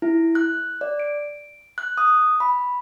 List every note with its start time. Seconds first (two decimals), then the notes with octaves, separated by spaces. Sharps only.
0.02 E4
0.35 F#6
0.81 D5
1.00 D7
1.78 F#6
1.98 D#6
2.40 B5